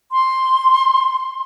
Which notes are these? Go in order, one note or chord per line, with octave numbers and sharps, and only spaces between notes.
C6